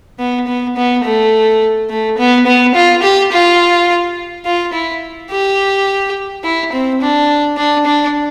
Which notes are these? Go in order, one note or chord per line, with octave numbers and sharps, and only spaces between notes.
B3
B3
B3
A3
A3
B3
B3
F4
G4
F4
F4
E4
G4
E4
C4
D4
D4
D4